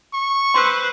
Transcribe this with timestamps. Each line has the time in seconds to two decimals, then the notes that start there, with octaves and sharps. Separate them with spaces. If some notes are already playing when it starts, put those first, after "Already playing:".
0.13 C#6
0.54 B4 C5 C6 E6